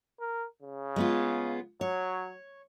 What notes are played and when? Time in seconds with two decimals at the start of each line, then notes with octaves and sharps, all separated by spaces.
0.20 A#4
0.63 C#3
0.96 G#3 B3 F4
1.81 F#3 C#5